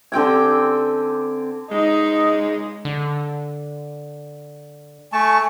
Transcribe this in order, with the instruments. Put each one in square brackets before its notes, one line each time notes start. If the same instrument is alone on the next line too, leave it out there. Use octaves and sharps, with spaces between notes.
[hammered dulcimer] D3 C4 G5 G#5
[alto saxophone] G#3 [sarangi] D#4
[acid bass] D3
[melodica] A3 A5 C#6 [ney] G#5